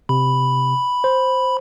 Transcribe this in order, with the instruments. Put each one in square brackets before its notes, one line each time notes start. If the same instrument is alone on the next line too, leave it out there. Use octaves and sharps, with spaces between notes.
[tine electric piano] C3 [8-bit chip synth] B5
[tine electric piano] C5